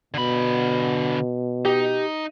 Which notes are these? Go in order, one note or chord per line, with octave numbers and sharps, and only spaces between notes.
B2 D3 B5
D#4 G4